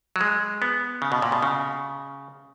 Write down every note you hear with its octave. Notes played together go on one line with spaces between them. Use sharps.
F#3
G#3
B3
C#3
B2
A#2
B2
C#3